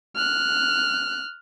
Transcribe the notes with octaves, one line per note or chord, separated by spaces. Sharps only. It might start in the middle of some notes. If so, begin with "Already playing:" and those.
F6 F#6